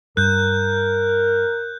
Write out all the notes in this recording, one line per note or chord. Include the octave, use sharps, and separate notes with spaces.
G2 A#4 F#6 G6